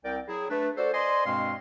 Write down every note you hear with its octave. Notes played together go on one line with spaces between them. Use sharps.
C2 C4 A#4 D5 G5
F#3 E4 G#4
A3 D4 B4
F#4 A4 C5 D5
C5 D5 D#5 G#5 C6
G2 B2 G#3 C4 F5 C6